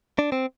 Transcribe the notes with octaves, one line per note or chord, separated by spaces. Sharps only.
D4
C4